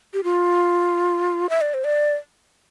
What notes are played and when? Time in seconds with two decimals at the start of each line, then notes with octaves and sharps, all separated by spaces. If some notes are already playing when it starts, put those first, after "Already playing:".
0.14 G4
0.24 F4
1.49 E5
1.61 D5
1.74 C5
1.84 D5